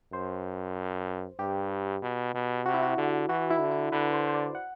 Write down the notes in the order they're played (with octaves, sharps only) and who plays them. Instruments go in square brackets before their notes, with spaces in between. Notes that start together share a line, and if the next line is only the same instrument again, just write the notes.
[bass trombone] F#2 [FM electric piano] C5
[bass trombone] G2 [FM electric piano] G4
[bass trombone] B2
B2
[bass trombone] C3 [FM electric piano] F#4
[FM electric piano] E4
F#4
[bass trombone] D3
[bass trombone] E3 [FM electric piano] F#4
[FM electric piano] E4
[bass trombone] D3
[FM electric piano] E4
[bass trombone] D3 [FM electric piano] B4
[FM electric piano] C5
C5
D5
F#5